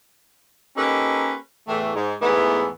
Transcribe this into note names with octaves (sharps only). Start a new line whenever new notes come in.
A#3 C#4 D#4 G4 A4 B4
E2 A2 E3 A3
G#2
E2 G#2 E3 A3 B3